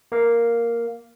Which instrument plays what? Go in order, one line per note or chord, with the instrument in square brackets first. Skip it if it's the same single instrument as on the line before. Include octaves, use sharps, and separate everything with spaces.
[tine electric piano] A#3 F5